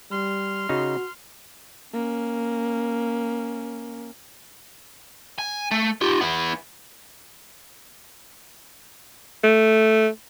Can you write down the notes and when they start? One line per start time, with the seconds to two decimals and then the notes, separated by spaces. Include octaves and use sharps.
0.11 G3 C6 F6
0.69 C#3 D#4 F#4
1.93 A#3 C#4
5.38 G#5
5.71 A3
6.01 F4 G4
6.21 B3 E4
9.43 A3